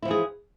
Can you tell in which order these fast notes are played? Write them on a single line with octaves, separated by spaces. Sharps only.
E4 F3 E3 G#4